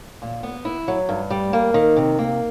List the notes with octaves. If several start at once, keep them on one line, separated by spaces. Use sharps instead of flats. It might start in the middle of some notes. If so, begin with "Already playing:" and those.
A#2
B3
E4
F#3
G2
G3
A#3
D#3
C3
A#3